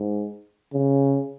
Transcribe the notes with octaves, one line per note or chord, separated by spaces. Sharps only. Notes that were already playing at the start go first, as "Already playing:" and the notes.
Already playing: G#2
C#3